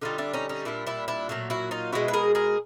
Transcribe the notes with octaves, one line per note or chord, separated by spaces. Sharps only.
D3 G3 D#4 F4
D4 E4
C#4 D#4
C#4 D#4
A#2 G3 D4 E4
D4 E4
D4 E4
A#2 F#3 A3
E4 F#4
D#4 F4
B2 G#3 E4 F#4
B4
G#4 A#4
G#4 A#4